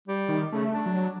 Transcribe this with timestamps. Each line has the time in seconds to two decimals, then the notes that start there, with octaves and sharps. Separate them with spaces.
0.08 G3
0.29 D#3
0.52 C#3 A3
0.73 D4
0.86 F#3